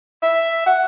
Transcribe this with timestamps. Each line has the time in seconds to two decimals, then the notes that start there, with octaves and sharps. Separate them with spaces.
0.23 E5
0.66 F#5